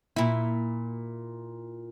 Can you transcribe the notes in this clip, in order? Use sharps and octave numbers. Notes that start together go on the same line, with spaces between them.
A#2 E4